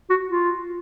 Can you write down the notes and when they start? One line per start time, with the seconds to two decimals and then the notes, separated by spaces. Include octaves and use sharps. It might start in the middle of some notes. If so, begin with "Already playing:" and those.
0.10 F#4
0.29 F4